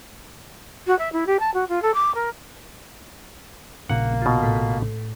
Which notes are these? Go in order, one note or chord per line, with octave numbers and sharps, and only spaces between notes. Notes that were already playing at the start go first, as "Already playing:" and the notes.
F#4
E5
E4
G4
A5
F#4
F4
A4
D6
A#4
A#1 A#2 C#3 A#3 F#5
B2 F4
A2